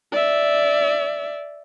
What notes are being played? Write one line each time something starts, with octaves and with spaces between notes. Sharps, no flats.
D5 E5